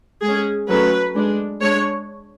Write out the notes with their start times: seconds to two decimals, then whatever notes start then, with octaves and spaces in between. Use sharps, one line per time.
0.22 G#3 G#4
0.27 C#4
0.69 F#3 A3 C#4 B4
1.14 G#3 D4
1.61 G#3 D4 C#5